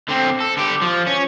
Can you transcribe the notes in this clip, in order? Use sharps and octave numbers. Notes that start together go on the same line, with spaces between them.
D3 C4
A4
D3 G4
F3
C#4